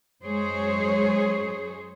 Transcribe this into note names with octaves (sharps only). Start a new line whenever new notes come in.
F#2 G#3 G#4 C5 C#5